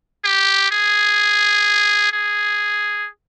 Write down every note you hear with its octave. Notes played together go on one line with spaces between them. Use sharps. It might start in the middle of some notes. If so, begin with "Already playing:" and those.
G4
G#4
G#4